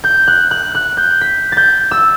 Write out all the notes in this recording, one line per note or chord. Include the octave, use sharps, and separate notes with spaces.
G6
F#6
F#6
F#6
G6
B6
G6 A6
E6